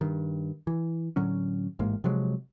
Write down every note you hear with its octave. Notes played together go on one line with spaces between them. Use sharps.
G2 D#3
E3
A2 D3 F#3 C#4
A1 G#2 G#3 A#3
C3 F3 F#3 G#3